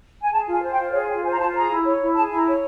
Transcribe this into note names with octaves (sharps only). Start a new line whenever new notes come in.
G#5
G#4 A5
F4
G#5
C5
G5
F4
G#4 C#5
F4 G5
C5 G#5
A#5
F4 A5
G#4 A#5
E4
C#5
E4
G#4 A5
E4
A#5
C#5